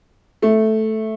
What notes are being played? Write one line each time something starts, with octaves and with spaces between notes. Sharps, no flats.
A3